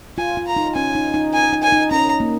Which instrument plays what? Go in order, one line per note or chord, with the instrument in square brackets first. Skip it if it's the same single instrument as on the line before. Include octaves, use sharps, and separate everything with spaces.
[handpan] F4 [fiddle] G#5
[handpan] F4
[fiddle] A#5
[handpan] D#4
[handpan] C#4 [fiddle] G#5
[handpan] D#4
D#4
[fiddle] G#5
[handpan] D#4
[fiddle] G#5
[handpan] D#4
[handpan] C#4 [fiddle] A#5
[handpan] A#3